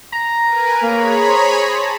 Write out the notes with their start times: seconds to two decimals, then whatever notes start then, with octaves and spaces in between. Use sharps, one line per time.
0.12 A#5
0.43 A#4 B4 G#5
0.82 A#3 G#4 C#5 B5
1.28 C5
1.65 A5